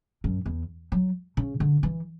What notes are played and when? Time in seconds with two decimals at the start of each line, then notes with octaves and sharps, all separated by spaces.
0.24 F#2
0.46 E2
0.92 F#3
1.37 C#3
1.60 D3
1.83 E3